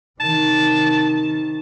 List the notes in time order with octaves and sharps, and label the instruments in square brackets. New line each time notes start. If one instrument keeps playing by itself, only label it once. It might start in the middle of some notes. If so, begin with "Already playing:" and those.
[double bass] C3 D#3 [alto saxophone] A5